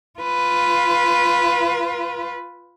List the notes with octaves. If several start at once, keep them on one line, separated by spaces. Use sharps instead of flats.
F4 B4